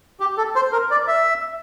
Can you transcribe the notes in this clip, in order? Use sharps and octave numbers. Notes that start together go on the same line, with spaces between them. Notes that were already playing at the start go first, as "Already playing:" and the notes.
G4
A4
C5
A#4
D5
E5